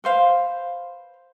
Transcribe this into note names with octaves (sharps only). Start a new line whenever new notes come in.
B4 C5 F5